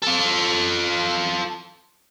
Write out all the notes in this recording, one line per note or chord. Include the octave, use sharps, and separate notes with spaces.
F4 A4